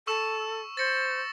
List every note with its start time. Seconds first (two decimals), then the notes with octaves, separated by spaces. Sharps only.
0.07 A4 C#6 E6 E7
0.77 C5 A6 A#6 C#7